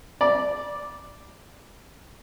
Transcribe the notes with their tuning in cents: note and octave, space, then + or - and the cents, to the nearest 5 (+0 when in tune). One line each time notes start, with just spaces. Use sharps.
D5 +0 B5 -45